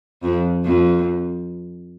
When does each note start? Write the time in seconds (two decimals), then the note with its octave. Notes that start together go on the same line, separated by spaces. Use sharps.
0.23 F2
0.65 F2